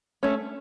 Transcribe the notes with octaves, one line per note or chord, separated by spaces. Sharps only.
A3 C#4